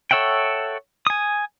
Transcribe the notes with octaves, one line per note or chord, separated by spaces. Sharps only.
A4 C#5 E5 F#5 G5
G#5 D#6